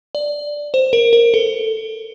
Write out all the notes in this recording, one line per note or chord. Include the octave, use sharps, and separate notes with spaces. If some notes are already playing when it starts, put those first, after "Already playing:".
D5
C5
A#4
A#4
A4